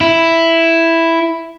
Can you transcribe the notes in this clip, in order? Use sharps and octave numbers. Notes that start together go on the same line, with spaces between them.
E4